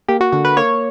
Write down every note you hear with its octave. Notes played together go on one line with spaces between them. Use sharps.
A#3 G4
F#4
D3 F#4
B4
A#3 C#5